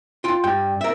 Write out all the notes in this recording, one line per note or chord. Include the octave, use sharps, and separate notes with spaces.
F4 G5 C6
G2 G3 G5
A#4 E5